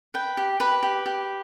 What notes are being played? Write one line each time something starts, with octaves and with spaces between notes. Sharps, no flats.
B4 G5
G4
G4 B4 B5
G4
G4